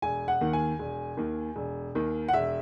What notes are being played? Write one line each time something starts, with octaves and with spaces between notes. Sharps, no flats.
E1 G#5
F#5
D#2 D#3
G#5
E1
D#2 D#3
E1
D#2 D#3
F#5
E1 E5